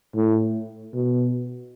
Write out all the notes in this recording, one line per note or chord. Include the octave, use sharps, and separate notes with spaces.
A2
B2